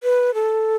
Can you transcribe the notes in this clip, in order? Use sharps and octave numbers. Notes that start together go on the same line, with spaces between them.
B4
A4